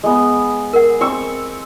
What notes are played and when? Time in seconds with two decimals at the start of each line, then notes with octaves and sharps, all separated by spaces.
0.03 G#3 B3
0.73 A#4 F#5
1.01 C4 C#6 E6